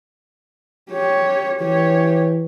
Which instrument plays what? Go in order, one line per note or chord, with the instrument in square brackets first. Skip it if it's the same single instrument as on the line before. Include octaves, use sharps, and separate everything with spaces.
[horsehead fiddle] G4 C#5
[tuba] E3 [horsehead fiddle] G4 C#5